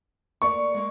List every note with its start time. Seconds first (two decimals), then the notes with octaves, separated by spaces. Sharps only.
0.42 D2 A#3 D5 C#6
0.74 G#3 A#3